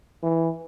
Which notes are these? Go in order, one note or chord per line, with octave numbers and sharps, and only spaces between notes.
E3